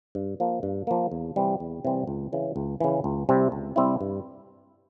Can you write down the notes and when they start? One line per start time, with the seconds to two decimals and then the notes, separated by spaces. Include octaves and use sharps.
0.15 G2
0.40 F3 A#3
0.63 G2
0.87 F3 A#3
1.12 E2
1.36 C3 E3 G3 C4
1.60 E2
1.85 C3 E3 G3 C4
2.07 C#2
2.33 C#3 E3
2.56 C#2
2.80 C#3 E3
3.04 C#2
3.29 C3 G3 C4 E4
3.52 C#2
3.76 C3 G3 C4 E4
4.01 G2